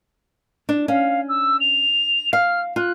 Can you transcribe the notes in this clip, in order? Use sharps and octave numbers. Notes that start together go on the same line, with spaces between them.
D4
C#4 F5
E6
F7
F5 F6
F4 F#6